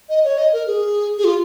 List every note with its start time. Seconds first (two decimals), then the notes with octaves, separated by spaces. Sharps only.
0.09 D#5
0.24 C#5
0.38 D#5
0.53 A#4
0.67 G#4
1.18 G#4
1.24 F4